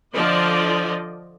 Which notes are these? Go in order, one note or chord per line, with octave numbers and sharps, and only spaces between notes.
D3 F3 D5 D#5